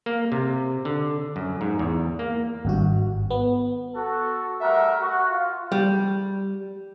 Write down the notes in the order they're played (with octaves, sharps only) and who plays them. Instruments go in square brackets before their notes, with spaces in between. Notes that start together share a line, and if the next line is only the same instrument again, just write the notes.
[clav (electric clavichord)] A#3
C3
D3
F#2
G#2
E2
A#3
[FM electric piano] G#1 G2 F#4
B3
[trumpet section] F#4 A4
G3 A3 A#4 E5 F#5 A#5
F#4
F4
[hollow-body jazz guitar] G3